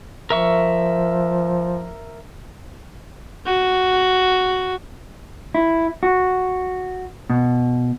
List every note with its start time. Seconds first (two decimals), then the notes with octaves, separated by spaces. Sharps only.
0.30 F3 A#4 E5 C#6
3.46 F#4
5.55 E4
6.03 F#4
7.30 B2